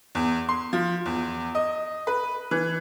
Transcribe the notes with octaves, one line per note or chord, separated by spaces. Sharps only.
E2
C6
F3
E2
D#5
B4
E3